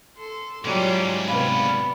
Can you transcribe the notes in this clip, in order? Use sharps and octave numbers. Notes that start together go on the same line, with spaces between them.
A4 C6
G#2 F#3 G3 C#4 F4 D6
C3 B3 D5 F5 B5